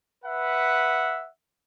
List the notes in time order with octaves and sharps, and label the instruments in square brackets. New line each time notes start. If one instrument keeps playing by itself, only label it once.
[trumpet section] B4 E5 F#5